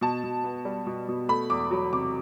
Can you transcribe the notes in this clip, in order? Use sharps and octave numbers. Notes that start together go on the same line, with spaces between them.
B2 A5
B2
B3
G3
B2
B2
A3 B5
E2 D6
F#3
C3 D6